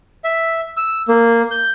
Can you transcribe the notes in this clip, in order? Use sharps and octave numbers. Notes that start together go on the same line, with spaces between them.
E5
E6
A#3
G6